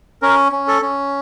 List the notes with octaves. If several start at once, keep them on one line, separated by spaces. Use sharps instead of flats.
C#4 A#4
C#4
A4
C#4